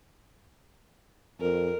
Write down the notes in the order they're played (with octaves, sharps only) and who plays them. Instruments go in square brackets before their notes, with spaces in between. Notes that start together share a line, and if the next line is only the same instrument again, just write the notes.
[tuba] F2 [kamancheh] A#4